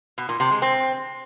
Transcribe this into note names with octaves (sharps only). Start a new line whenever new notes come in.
B2
A#2
C3
G#3
C4